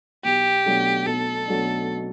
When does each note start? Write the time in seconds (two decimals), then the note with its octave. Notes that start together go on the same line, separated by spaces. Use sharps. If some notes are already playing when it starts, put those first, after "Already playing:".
0.24 B1 G4
0.66 B2 F#3 A3 D4
1.06 B1 A4
1.47 B2 F#3 A3 D4